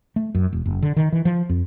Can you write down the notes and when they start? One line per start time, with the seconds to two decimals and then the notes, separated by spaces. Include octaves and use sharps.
0.16 A3
0.35 F#2
0.53 E1
0.66 F#1
0.82 D3
0.96 D#3
1.12 E3
1.25 F3
1.49 F2